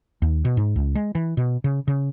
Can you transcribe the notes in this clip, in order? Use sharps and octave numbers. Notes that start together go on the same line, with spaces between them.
D#2
B2
G#2
C#2
G#3
E3
B2
C#3
C#3